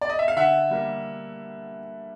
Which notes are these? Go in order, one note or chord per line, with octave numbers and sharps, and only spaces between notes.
D5
D#5
E5
F5
D3 E5 F#5
G3 A#3